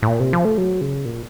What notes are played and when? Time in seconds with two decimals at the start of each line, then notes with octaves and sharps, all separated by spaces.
0.02 A2
0.08 A#2
0.20 C3
0.33 F3
0.45 A3
0.58 F#3
0.81 C#3
1.05 A#2